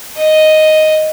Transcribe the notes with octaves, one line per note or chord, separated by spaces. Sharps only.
D#5